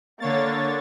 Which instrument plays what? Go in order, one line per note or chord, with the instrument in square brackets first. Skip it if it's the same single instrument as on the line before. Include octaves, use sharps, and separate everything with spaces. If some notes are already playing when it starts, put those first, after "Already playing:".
[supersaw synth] D3 C#5 A6 [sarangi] A#3